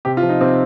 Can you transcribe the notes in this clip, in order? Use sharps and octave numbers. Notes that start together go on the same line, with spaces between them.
C3 G4
F4
F3
D#4
C3 C4